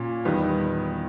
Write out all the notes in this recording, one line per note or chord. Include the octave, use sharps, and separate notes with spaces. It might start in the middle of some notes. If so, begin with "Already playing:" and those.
Already playing: A#2 C#4
E2 D#3 G3 B3